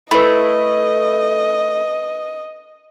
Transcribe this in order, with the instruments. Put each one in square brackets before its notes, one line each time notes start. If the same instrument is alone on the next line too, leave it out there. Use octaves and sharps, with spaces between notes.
[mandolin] A3 E4 [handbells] B4 B5 [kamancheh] D#5